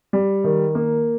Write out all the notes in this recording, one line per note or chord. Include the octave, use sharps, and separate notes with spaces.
G3
D#3
A#3